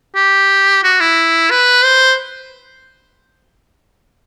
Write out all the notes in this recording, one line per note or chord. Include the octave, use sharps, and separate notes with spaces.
G4
F#4
E4
B4
C5